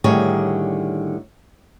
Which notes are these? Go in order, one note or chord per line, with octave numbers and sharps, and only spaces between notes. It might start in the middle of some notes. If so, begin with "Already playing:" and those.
A2 D3 D#3 G3 G#4 C#5